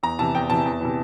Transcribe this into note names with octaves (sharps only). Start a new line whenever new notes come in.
E2 A#5
C3 E3 A5
E2 G5
C3 E3 A5
E2
C3 E3